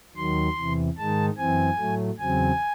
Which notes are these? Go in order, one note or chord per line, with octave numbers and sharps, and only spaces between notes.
D#2 D#3 F#3 C6
E2 C3 E3
G#2 D#3 G#3 D#4 A5
F#2 E3 C4 G#5
A2 F#3 A3
E2 C#3 F#3 C4 G#5